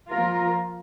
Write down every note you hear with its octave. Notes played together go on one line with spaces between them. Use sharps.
F3 A#3 F4 A#4